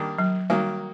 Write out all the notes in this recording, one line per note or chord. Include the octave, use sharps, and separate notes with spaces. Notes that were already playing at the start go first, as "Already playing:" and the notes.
Already playing: D#3 G3 A#3 D4
F#3
D#3 F#3 G3 A#3